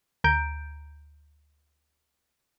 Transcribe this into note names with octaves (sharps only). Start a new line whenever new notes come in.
D2 A#5 G6 D7